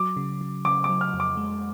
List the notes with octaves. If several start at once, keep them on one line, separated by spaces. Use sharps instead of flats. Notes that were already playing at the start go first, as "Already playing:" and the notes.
Already playing: F#3 D6
C#3
C#3
C#3 D6
D6
F#3
F6
F2
D6
G#3